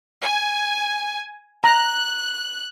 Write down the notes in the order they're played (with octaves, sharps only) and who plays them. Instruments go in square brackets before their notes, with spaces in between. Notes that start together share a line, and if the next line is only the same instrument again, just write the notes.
[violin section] G#5
[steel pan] A#5 [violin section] F#6